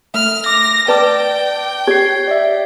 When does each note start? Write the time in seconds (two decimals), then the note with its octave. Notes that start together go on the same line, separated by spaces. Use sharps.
0.14 A3 F6
0.46 D6 A#6
0.88 B4 D5 G5 A5 D6
1.87 G4 C#5 G#6 C7
2.28 D5 E5